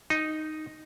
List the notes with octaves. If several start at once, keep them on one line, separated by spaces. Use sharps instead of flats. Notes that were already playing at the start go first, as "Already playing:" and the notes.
D#4